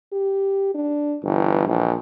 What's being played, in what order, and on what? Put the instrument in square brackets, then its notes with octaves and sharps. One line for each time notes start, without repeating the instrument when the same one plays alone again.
[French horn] G4
D4
[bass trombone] G1 [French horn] E3
[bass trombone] A#1